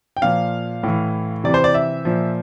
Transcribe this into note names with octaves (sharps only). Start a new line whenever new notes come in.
G5
A#2 F3 F5
A2 E3
C3 E3 D5
C5
D5
E5
A#2 F3